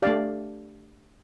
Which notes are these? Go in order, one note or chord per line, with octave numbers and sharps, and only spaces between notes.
A3 D4 G4 D5 F5